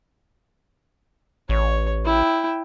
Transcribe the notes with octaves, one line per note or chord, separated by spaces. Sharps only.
A1 C#5
E4 G5